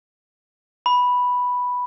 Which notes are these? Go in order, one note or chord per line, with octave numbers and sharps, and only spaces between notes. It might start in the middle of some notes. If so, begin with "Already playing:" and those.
B5